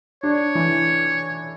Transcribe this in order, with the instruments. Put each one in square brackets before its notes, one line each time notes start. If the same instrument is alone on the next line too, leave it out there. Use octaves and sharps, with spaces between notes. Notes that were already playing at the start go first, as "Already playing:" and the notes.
[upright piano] D4 [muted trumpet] C#5
[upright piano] E3